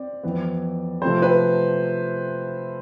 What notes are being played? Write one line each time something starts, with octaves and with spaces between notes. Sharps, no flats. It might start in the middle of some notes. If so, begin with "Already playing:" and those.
Already playing: C4 D5
F2 E3 B3
C3 F3 A3 C4 C5
B4